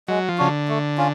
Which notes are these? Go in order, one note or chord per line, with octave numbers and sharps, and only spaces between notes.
F#3 G#3
F3
C#3 D4 F#4
D3
A3
C#4 F4